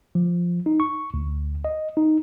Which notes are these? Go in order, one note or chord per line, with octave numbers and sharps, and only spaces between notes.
F3
D#4
C#6
D2
D#5
D#4